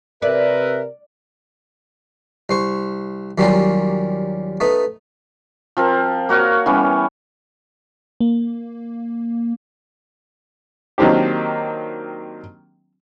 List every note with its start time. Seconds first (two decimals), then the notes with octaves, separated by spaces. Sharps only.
0.22 C3 A#4 B4 D5 E5
2.49 C2 C5 C#6
3.38 D#2 F#3 G3 A#3 C#4 F4
4.60 A3 B3 D#4
5.77 F3 C4 A#4
6.29 A#3 F#4 C#5 F5
6.66 E3 G3 B3 C#4
8.21 A#3
10.98 D#3 F#3 A#3 C4 D4 G4